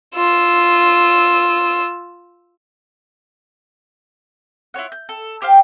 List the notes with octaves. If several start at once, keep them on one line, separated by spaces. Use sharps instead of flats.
F4 E6
E4 F4 C#5 F#5
G6
A4
G4 C5 F5 G5